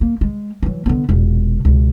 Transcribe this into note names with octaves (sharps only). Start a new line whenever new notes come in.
A#3
G#3
E3 F#3
D3 B3
E1 A#2
C#2 B2